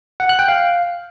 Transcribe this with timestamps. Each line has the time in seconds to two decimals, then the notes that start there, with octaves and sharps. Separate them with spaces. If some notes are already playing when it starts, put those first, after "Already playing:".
0.20 F#5
0.29 F#6
0.39 G5
0.48 F5